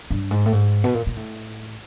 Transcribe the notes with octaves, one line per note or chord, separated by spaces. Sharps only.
G2
G#2
A2
G#2
B2
A#2
A#2
A2